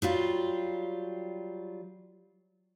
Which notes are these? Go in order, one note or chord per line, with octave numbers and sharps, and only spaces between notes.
F#3 G3 F4